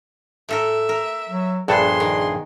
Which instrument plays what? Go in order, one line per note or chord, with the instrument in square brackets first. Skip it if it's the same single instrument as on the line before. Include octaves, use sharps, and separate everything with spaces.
[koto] A2 A4 A#4 [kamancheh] E5
[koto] A#4
[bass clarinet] F#3
[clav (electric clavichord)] A#1 G2 A4 [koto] B3 [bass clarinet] G#4 [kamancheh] C6
[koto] D#3